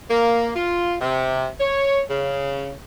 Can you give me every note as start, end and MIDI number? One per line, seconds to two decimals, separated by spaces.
0.10 0.52 58
0.56 0.95 65
1.01 1.48 48
1.61 2.00 73
2.10 2.72 49